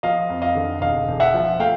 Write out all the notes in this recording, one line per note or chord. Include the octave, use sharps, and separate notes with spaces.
F3 D#5 F5
F2
D#5 F5
D3
E1 D#5 F5
E1
E5 F#5
F3
A3 F5 G5